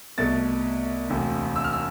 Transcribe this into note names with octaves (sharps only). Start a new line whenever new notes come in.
C2 B2 A3 A6
E1 D2 C3
E6
F6
E6